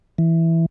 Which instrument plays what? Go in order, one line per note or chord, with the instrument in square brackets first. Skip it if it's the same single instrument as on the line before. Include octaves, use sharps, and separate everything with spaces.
[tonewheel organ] E3